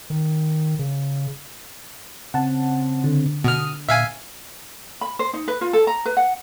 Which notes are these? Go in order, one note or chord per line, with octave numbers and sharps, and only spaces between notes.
D#3
C#3
C#3 C4 F#5 A5
D3
B2 D#6 F6
A#2 E5 F5 G#5
B5
C5
D#4
B4
F4
A4
A#5
B4
F#5